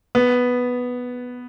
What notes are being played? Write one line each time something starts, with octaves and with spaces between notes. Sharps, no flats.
B3